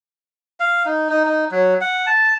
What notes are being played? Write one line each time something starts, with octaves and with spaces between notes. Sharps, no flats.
F5
D#4
D#4
D#4
F#3
F#5
A5